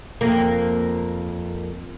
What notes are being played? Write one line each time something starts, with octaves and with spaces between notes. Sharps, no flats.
F2 A#3